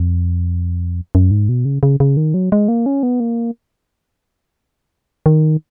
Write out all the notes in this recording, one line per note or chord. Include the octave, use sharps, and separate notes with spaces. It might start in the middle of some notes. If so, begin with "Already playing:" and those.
Already playing: F2
F#2
G#2
B2
C#3
C#3
C#3
D#3
F#3
G#3
A#3
C#4
B3
A#3
D#3